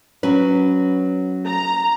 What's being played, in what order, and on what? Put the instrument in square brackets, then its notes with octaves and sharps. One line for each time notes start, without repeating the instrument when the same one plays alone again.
[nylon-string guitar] F#3 C#4 B4
[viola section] A#5